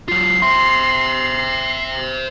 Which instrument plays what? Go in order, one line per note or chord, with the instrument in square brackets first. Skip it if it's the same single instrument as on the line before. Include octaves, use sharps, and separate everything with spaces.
[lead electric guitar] F#3 F4 [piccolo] C7
[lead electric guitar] C5 E5 [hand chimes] C6